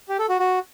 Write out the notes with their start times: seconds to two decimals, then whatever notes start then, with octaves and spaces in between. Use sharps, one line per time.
0.09 G4
0.19 A4
0.29 F#4
0.39 F#4